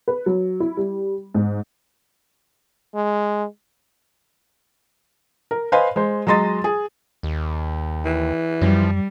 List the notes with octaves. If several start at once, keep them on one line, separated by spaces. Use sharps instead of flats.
B4
F#3
E4
G3
G#2
G#3
A#4
B4 C5 D#5 F5 G#5 B5
G#3 C5
F#3 G#3 D#5 C6 A6
G#4
D#2
E3
F#2 F3 G3